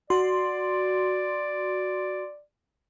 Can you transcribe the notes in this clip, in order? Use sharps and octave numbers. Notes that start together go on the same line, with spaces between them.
F#4 D5 C6